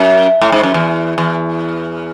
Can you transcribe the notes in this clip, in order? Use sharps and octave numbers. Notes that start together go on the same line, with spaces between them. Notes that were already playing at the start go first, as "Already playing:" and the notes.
Already playing: F#2
A2
G#2
F#2
E2
E2